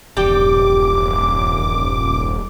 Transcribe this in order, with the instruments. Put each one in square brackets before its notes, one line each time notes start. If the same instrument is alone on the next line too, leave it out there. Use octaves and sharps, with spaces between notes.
[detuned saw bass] D#1 [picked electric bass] A#1 E2 G2 [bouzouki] G3 G4 G5 [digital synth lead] D6